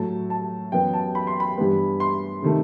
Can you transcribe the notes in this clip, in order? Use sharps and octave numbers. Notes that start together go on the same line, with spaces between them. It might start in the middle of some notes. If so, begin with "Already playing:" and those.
Already playing: A2 F#3 A3 A5
A5
F#2 E3 B3 G5
A5
B5
C6
B5
G2 E3 G3 B3
C6
C3 D#3 A3